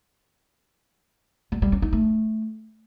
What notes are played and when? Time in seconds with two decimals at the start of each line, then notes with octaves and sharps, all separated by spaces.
1.52 G3
1.62 G3
1.72 C#4
1.82 D#4
1.92 A3